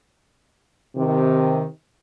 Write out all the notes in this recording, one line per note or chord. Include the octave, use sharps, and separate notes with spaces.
C3 D#3